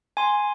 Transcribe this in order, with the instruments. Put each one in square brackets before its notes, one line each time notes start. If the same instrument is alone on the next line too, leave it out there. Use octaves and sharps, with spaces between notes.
[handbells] G#5 C6